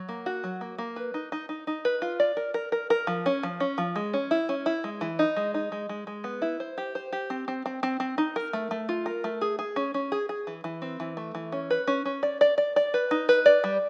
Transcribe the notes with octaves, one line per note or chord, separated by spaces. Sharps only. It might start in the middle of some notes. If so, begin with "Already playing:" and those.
Already playing: F#3
A#3
F#4
F#3
A#3
A#3
B4
D#4
D#4
D#4
D#4
B4
F4
D5
A#4
A#4
A#4
A#4
F3
C#4
F3
C#4
F3
G#3
C#4
E4
C#4
E4
G#3
E3
D#4
G#3
D#4
G#3
G#3
G#3
B3
E4
C5
G4
C5
G4
C4
C4
C4
C4
C4
D#4
A#4
A3
A3
F4
A#4
A3
G#4
G#4
C#4
C#4
G#4
G#4
E3
E3
C4
E3
A3
E3
C#4
B4
C#4
C#4
D5
D5
D5
D5
B4
D#4
B4
D5
G3